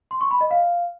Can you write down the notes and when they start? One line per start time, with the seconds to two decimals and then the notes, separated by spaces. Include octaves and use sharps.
0.11 C6
0.21 C#6
0.31 B5
0.41 D#5
0.51 F5